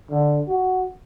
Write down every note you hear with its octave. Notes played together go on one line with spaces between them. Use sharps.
D3
F#4